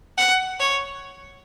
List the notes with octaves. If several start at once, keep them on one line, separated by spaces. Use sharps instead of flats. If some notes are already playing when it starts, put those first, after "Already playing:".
F#5
C#5